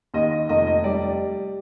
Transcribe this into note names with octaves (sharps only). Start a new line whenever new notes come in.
D#2 D#5
D#5
F1 D#5
D#5
G3 D5